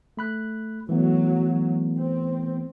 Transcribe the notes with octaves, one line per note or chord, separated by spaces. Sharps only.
A3 B5 F#6
E3 F#3 A3 B3
C4